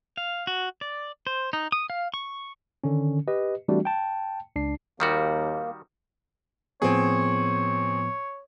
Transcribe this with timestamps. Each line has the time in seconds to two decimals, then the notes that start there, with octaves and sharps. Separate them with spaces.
0.17 F5
0.47 F#4
0.81 D5
1.27 C5
1.53 D#4
1.72 D#6
1.90 F5
2.14 C#6
2.84 D3 D#3 C#4
3.28 G4 B4 D#5
3.68 E3 G3 A3 C4 D4 F#4
3.85 G5 A5
4.56 C#2 D4 C7
5.00 D#2 D#3 G3 A#3 F#4
6.82 A2 F3 B3 C4 G#4 C#5